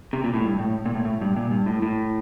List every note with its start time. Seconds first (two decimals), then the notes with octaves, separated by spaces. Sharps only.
0.13 C3
0.24 A#2
0.34 A2
0.44 G2
0.59 A2
0.86 A#2
0.95 A2
1.05 A2
1.21 G2
1.36 A#2
1.51 G2
1.66 A2
1.82 A2